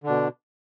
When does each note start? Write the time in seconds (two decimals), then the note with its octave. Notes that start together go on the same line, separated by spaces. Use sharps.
0.03 D3
0.06 D4
0.09 B2